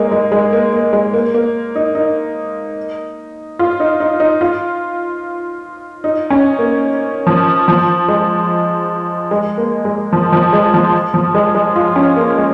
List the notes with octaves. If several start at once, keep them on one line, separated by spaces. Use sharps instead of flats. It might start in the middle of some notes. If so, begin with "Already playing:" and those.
Already playing: G#3 A#3 D#4
G#3
G#3
A#3
A#3
G#3
A#3
A#3
D#4
D#4
F4
D#4
D#4
D#4
F4
D#4
C#4
A#3
F3
F3
G#3
G#3
A#3
G#3
F3
F3
G#3
F3
F3
G#3
G#3
F4
C#4
A#3
G#3